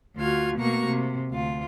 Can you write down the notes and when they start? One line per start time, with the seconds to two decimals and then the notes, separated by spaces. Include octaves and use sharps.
0.18 D2 F4 F#4 F6 G#6
0.58 B2 A3 A#3 F#4 A#5 C#6
0.87 C3
1.32 D2 F4